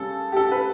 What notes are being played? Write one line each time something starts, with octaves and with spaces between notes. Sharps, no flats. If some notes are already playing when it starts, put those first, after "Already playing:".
Already playing: C#3 G3 C#4 A4
G4
A4
B4